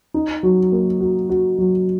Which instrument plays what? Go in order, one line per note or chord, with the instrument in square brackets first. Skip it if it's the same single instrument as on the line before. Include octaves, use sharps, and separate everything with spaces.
[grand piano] D#4
F#3
A#3
F#4
F#4
F#3